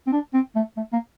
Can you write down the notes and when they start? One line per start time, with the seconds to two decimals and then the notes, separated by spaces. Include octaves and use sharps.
0.07 C4
0.12 D4
0.34 C4
0.56 A3
0.77 A3
0.93 A#3